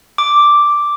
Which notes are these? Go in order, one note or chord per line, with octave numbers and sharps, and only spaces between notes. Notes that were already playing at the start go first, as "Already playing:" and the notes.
D6